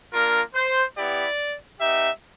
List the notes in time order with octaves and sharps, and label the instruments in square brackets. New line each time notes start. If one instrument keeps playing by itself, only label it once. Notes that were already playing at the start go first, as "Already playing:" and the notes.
[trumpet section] A#3 D4 F4 A#4
C5
B3 E4 G4 D5
B3 D#4 G4 E5